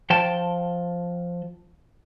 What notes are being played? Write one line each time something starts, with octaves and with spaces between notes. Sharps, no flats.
F3 G5 A5